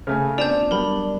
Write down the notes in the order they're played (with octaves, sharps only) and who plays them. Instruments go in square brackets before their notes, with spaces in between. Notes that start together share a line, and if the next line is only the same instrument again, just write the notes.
[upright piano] C#3 A3 G#5 [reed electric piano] F6
[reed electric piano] B3 C4 F4 [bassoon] D4 [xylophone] D5 A5 G6 [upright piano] F7
[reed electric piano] F#3 G3 B3 [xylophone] A#4 B5